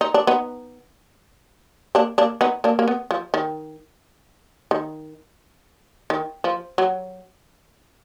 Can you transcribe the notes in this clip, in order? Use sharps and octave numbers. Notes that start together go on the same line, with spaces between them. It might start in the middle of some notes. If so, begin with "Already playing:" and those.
D#4
D4
B3 D#4
A#3 D4
A#3 D4
B3 D#4
A#3 D4
A#3
B3
F3
D#3
D#3
D#3
F3
F#3